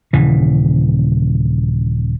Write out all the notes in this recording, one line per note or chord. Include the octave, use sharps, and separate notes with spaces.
D#1 C#3 E3